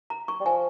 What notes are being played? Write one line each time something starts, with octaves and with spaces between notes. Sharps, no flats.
A#5
C#6
G3
F3 G#5